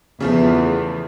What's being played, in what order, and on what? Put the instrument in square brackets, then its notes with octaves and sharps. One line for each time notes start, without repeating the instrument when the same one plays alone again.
[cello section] E2 [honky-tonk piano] C#3 F3 A3